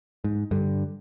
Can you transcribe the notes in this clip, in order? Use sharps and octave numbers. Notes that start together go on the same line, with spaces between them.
G#2
G2 D3